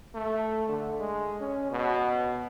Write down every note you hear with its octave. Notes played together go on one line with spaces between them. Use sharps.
A3
D3
G#3
C#4
B2